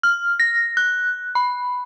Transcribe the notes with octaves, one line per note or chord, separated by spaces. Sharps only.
F6
A#6
F#6
B5